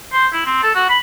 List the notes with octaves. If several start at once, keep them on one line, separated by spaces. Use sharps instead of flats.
C5
E4
C4
A4
F#4
B5